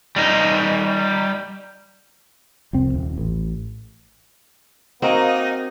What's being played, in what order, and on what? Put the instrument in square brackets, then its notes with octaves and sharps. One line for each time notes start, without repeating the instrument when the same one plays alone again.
[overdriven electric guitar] G3 D#4
[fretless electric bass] F1 C2 C4
D#1
A1
[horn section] A#3 D#4 [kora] C4 F#4 A#4 [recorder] D#5